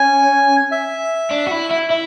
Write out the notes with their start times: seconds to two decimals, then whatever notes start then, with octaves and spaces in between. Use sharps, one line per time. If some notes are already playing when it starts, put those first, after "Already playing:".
Already playing: C#4 G#5
0.72 E5
1.31 D4
1.47 F#4
1.51 E4
1.71 E4
1.90 E4 E5